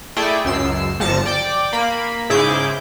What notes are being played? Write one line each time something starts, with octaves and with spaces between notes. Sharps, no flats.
A3 E4 G#4 D5 G5
C#2 F#2 E6 C7
G1 F3 A5 A#6 C#7
D5 G5 D6
A#3 B5
G#2 C#3 E4 G#4 D6 G6